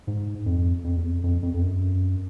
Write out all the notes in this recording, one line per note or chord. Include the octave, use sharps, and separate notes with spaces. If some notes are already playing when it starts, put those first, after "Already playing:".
G#2
F2
F2
E2
F2
F2
F2
F2
F#2